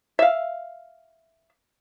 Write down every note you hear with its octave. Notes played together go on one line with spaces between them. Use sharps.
E5 F5